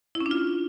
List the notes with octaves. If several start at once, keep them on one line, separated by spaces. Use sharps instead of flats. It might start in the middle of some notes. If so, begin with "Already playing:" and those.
E4
C#4
D4
F4